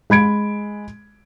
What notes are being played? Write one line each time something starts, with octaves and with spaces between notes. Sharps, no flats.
G#3 B5 G#6 D7